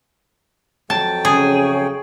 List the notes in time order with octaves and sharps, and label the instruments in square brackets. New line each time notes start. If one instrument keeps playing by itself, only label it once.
[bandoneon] F2 F#3 G5 [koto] A5
[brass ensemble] C#3 C#5 [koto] G#4